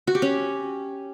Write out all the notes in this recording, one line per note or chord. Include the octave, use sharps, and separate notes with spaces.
F#4
G4
C#4